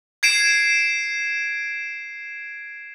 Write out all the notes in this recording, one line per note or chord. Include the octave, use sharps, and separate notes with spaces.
G#6 C7 D7 E7